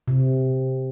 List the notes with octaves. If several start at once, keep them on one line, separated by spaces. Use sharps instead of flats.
C3